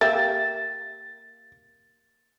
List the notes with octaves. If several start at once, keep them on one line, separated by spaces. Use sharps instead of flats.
A#3 G4 E5 A6